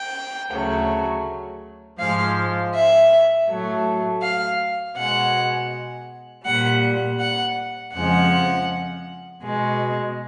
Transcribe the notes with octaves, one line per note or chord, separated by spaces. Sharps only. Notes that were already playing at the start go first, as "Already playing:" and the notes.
Already playing: G5
D2 C#3 F#3 A3
G#2 F3 G#3 F5
E5
A2 F#3 A3
F5
B2 G#3 F#5
A#2 G3 F#5
F#5
F2 C#3 F3 G#3 F#5
B2 G#3